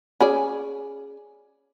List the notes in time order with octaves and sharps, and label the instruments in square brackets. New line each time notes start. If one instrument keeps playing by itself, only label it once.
[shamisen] C#4 G#4 D5